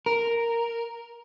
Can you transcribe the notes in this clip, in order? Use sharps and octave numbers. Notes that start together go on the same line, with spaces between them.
A#4